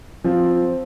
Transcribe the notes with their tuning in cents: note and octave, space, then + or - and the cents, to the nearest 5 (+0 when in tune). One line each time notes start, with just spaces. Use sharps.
F3 +5 C4 +0